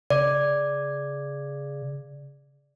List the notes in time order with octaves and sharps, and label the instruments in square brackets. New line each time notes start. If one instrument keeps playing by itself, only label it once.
[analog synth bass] C#3 [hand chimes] D5